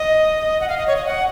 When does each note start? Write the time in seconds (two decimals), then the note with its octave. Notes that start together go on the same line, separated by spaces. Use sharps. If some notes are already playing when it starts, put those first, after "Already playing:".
Already playing: D#5
0.61 F#5
0.69 F5
0.77 D#5
0.87 C#5
0.96 D#5
1.06 F#5